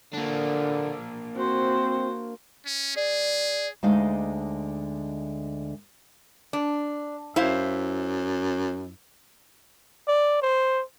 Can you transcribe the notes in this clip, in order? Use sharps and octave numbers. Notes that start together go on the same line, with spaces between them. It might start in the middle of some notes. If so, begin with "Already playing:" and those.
D3 A#3 D4
C4 F#4 C5
C#4
G#4 D5
D2 D3 G#3 D#4 D#5 F5
D4
F#2 E4 C5 F5
D5
C5